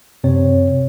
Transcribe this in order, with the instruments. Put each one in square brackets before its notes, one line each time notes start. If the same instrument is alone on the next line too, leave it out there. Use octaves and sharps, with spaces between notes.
[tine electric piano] F#2 C3 C4 C#5